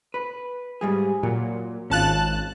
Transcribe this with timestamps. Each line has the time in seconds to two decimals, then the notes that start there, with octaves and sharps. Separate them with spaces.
0.14 B4
0.81 G#2 G3 G#4
1.23 A#2 F#3
1.90 G#1 C#4 F4 A5 F#6